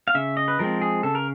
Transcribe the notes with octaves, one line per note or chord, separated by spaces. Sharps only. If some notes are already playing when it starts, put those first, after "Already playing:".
F5
C#3 E5
D#5
B4
F3 G#3 C4 A#4
G#4
C#3 A4
A#4